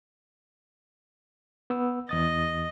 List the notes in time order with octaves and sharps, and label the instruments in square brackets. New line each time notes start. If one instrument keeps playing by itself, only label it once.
[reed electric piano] B3 E6
[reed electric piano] E2 D#6 A6 [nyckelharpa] D#5